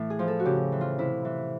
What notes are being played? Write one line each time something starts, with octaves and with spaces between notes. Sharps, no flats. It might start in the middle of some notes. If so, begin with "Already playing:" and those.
Already playing: A2 E3
G#4
F3
A4
F#4
C#3 G4
E3
F4
C3 E4
E3